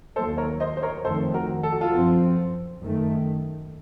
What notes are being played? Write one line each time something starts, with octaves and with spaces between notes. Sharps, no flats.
D#2 D#3 F#3 A#3 A4 C5
A#4 C#5
C5 D#5
C5
A#4 C#5
F2 D#3 A3 C4 A4 C5
F#4 A#4
A4
F#4
F4 A4
F#2 F3 C4
F#2 D#3 A3